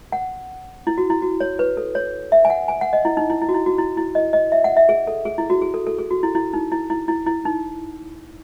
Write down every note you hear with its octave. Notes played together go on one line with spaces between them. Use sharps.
F#5
E4
F#4
E4
F#4
C#5
B4
A4
C#5
E5
G#5
F#5
G#5
F#5
D#5
E4
D#4
E4
E4
F#4
E4
F#4
E4
E4
D#5
D#5
E5
F#5
E5
G#4
A4
G#4
E4
F#4
G#4
A4
A4
G#4
F#4
E4
E4
D#4
E4
E4
E4
E4
D#4